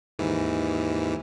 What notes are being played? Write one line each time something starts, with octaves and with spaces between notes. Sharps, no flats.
D#2 G#2 E3